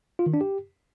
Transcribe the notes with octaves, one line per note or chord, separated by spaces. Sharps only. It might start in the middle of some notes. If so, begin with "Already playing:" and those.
F4
D#3
D4
G4